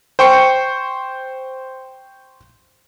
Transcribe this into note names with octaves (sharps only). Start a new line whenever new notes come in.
C5 G5 C#6 C#7